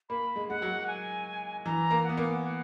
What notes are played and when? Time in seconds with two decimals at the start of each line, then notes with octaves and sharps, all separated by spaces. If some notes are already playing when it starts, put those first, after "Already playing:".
0.09 A#3 B5
0.36 G#3
0.49 G#3 F#5
0.62 F#3
0.87 G#5
1.66 E3 A#5
1.91 A#3
2.04 B3 F#5
2.17 A#3
2.43 F#5